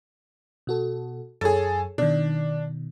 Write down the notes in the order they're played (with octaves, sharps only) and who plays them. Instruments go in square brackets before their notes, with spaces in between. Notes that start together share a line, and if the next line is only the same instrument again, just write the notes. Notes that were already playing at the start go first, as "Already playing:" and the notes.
[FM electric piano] B2 F#4 A4
[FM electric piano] F#2 C#5 [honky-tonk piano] G#4 A4
[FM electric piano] B2 D#3 [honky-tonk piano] D4